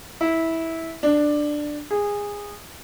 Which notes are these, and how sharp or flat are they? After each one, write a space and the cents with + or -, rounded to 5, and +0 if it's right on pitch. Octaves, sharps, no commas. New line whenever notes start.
E4 -15
D4 +10
G#4 -20